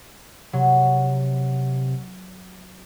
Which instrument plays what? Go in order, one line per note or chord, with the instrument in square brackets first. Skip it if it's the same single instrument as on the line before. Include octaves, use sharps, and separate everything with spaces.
[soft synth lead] C3 [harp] F#3